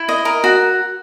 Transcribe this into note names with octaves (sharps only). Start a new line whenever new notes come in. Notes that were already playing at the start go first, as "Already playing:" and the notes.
Already playing: E4
D#5
A#4
F#4